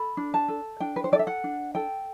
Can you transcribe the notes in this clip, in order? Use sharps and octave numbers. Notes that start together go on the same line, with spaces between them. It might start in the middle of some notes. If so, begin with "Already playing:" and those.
Already playing: A4 B5
D4
A5
A4
D4 G5
B4
C5
A4 D5
E5
F#5
D4
A4 G5